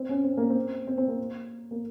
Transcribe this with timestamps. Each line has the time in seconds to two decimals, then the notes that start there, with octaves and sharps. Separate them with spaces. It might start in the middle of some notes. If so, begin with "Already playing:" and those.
Already playing: C4
0.09 C#4
0.24 C4
0.37 A#3
0.50 C4
0.87 C4
0.98 C4
1.08 A#3
1.71 A#3